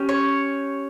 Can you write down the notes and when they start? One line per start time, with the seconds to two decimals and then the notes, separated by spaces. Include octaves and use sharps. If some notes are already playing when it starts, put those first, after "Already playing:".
Already playing: C#4 G4
0.09 C#5